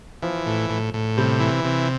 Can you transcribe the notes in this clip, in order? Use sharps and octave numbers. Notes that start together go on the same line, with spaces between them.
E3 F3
A2
A2
A2
C3 G3
E3
C3